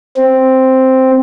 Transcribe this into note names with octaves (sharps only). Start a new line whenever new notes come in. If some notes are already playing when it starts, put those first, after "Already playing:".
C4